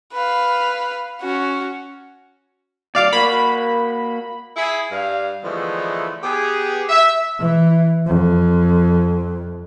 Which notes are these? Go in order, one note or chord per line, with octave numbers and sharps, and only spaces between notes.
B4 F5
C#4 F#4
D2 F#3 D5 F5 D6
A#3 F#4 B5
E4 G#4
G2 F5
D3 E3 F3 G#3 A3 B3
B3 G4 G#4
E5
E3
F2